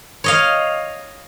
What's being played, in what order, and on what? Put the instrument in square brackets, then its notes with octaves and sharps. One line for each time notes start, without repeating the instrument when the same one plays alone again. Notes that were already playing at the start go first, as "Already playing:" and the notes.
[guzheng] C#5 D#5 F5